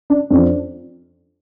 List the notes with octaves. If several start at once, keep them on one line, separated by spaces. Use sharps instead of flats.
D4
F2 F3 D4